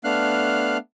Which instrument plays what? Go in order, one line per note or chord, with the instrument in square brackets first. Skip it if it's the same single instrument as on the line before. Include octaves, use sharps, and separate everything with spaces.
[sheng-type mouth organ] A3 B3 D4 F5 F6 F#6